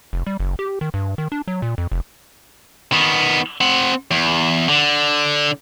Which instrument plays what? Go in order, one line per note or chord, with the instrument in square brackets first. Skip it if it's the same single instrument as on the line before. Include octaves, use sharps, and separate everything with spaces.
[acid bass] F1
G3
F#1
G4
D#3
G2
D#3
D4
F#3
A#2
F2
F1
[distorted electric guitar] D#3 B3
C4 F#5
E2
D3